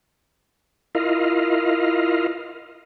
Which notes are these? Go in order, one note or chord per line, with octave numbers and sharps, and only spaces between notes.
E4 F4 A#4 D#5 F5